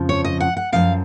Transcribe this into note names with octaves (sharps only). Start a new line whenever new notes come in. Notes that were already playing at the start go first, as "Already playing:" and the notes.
Already playing: F2 C#3 F3
C#5
D#5
F#5
F#5
F#2 C#3 F3 F5